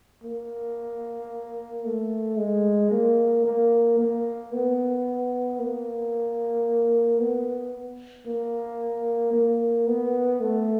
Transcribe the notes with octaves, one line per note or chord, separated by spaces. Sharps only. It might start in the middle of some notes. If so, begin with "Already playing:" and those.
A#3
A3
G#3
A#3
A#3
A#3
B3
A#3
B3
A#3
A#3
B3
A3